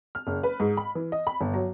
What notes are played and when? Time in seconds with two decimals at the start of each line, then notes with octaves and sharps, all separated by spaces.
0.15 F6
0.27 F#1
0.43 B4
0.60 G#2
0.77 B5
0.95 E3
1.12 D#5
1.27 B5
1.41 G1
1.54 F#3